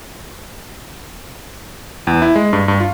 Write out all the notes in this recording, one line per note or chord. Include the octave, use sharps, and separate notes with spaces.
E2
E4
G#3
G2
G2
F4